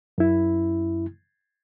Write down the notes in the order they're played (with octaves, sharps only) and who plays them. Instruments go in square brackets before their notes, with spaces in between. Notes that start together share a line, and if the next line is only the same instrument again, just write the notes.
[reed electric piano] F#2 E4